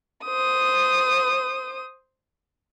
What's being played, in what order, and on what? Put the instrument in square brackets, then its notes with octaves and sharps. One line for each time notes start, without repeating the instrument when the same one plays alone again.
[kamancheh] C5 D#6